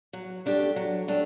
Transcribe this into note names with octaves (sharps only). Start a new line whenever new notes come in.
F#3
A3 D4 G4
F#3
A3 D4 G4